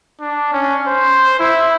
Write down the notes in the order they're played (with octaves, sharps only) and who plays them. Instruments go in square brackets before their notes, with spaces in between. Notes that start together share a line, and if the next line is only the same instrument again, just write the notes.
[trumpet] D4
C#4
C5
E4